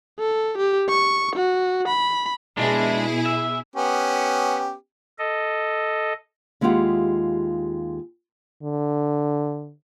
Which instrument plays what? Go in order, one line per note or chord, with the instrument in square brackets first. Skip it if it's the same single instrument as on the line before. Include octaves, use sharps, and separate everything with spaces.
[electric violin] A4
G4
C#6
F#4
B5
[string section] B2 E4 G#4 [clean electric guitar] G#3 D4
[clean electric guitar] E5
[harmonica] B3 C#4 G4
[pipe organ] A4 D#5
[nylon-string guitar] D#2 G#3 E4 F4 G4 F#5
[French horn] D3